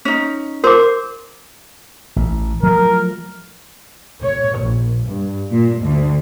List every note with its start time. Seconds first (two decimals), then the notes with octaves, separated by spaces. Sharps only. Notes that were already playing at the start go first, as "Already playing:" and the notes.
0.05 C#4 D#4
0.64 A#4 C5 D6
2.16 A1
2.63 F3 F#3 A3 A#4
4.22 C#5
4.59 A#1
5.06 G2
5.50 A#2
5.81 D2